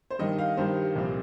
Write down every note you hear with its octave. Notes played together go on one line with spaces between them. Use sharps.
C5
G2 D#3 G3 D#5
F5
G2 D#3 G3 C5
C2 A#2 F3 C4